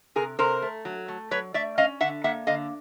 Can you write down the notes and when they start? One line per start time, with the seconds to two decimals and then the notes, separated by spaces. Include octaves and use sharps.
0.15 C3 G#4 A#4
0.39 C3 A#4 C5
0.62 A3
0.85 F#3
1.08 A3
1.31 F#3 B4 C#5
1.54 A3 D5 E5
1.78 C#4 D#5 F5
2.01 D3 E5 F#5
2.24 A#3 E5 F#5
2.47 D3 D#5 F5